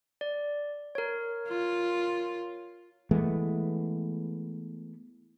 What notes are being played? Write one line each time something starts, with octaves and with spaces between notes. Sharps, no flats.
D5
A#4 C#5
F4
E3 G#3 A3 B3